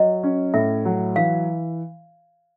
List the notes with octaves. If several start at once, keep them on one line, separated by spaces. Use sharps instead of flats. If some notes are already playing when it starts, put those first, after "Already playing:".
Already playing: F#3 D#5
C#4
A2 E5
F#3
E3 F5